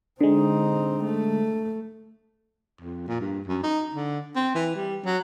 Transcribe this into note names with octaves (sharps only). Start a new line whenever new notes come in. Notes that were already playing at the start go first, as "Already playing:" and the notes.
D3 G#3 C4 D#4
A3
F2
A#2
G2
F#2
D#4
D3
C4
E3
G3
F#3